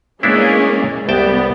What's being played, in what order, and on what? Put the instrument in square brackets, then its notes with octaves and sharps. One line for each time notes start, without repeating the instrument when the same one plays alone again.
[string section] G#3 A#3 C#4 [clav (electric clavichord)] B3 D4 E4
[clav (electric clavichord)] C2 G5 A5 [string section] G3 B3